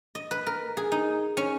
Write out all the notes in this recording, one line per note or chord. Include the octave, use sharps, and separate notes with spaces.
D#5
B4
A#4
G#4
D#4
C#4